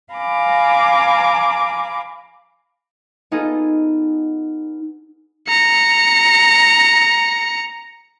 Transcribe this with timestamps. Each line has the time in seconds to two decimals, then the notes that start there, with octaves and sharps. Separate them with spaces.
0.14 F5 G#5 A#5 B5 D6
3.31 B3 D#4 F4 G#4 A4
5.49 A#5 C#7